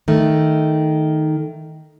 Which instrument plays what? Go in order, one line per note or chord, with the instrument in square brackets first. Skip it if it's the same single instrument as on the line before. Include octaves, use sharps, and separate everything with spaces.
[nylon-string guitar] D#3 A3